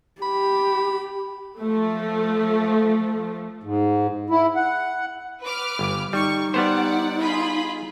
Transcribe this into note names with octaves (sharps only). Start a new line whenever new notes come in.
G4 B5
F3 A3
G#2
E4
F#5
B4 D6 F6
G1
G3 D#4 C#6
G3 B3 C5 D5 F#5
F4 G#4 B5